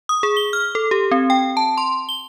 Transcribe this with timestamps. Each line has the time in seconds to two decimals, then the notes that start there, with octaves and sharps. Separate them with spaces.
0.09 D#6
0.23 G#4
0.37 G7
0.53 F6
0.75 A4
0.91 G4
1.11 C4
1.30 G5
1.57 A5
1.78 C6
2.09 G7